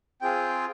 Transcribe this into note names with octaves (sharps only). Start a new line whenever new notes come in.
C4 F4 G#4 G5